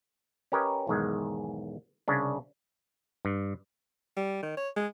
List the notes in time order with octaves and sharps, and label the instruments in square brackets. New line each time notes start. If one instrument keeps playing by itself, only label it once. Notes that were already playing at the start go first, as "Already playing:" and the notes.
[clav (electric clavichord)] C#4 G4 A#4 B4 C#5 D#5
B1 E2 G#2 D#3 G#3
C2 C#3 C#4 D4
G2
[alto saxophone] G3
D#3
C#5
G#3